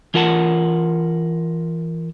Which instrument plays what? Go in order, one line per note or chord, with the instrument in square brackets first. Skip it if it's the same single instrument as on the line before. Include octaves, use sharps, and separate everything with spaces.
[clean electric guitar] E3 F4 A#4 F#5 A5